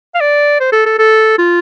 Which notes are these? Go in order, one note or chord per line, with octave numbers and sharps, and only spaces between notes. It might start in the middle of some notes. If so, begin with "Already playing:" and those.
F5
D5
C5
A4
A4
A4
F4